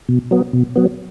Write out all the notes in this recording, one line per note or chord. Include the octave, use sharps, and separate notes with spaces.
B2
F#3 B3
B2
F#3 B3